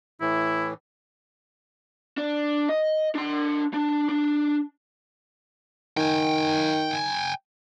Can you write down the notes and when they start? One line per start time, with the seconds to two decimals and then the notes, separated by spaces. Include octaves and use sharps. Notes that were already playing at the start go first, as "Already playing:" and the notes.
0.21 A2 E3 E4
2.18 D4
2.69 D#5
3.15 D4 C6
3.74 D4
4.09 D4
5.97 D#3 G5 G#5